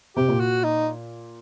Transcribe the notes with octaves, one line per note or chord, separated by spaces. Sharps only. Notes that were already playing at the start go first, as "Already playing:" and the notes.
C3 G4
A#2
F#4
D#4